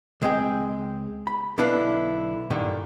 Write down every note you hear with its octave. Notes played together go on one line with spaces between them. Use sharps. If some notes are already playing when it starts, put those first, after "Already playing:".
C#2 G#3 C4 G#4 G5
B5
B1 D3 D4 E4 B4 F5
G2 A#2 D3 D#3